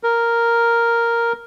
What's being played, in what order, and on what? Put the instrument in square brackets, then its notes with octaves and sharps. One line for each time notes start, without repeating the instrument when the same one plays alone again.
[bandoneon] A#4